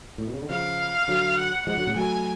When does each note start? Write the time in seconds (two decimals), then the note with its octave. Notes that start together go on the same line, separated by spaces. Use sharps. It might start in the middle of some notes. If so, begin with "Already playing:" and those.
0.18 A2
0.27 B2
0.34 C#3
0.42 D3
0.50 C#3 F3 F5
1.08 D3 F#3
1.37 F#5
1.67 F3 G#3 F#5
1.77 D3 F#3
1.87 A2 C#3
1.96 F#3 A3 G#5